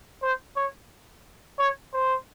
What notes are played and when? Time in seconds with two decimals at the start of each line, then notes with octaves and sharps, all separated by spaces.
0.22 C5
0.56 C#5
1.58 C#5
1.93 C5